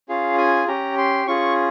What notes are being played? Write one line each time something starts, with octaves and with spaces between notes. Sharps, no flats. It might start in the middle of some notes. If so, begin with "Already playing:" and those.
C#4 F4 G#4 F5
G#5
C#4 G4 A#5
C6
C#4 F4 G#4 C#6